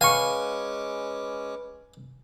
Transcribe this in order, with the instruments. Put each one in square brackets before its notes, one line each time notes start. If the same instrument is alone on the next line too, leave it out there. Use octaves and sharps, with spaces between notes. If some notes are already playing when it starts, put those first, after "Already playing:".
[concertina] G#3 C#4 D6 [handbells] B4 B5 [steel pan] F5 C#6 [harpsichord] G#5